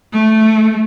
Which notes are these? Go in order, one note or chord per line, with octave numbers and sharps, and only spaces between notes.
A3